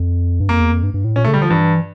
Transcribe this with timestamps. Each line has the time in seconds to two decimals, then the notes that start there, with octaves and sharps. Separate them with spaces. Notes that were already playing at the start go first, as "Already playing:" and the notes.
Already playing: F2
0.40 G2
0.49 F2 A#3
0.60 E2
0.71 F2
0.83 G2
0.94 G2
1.04 A2
1.16 A#2 C#4
1.24 A3
1.28 C#3
1.34 G3
1.38 D3 F3
1.50 G2 E3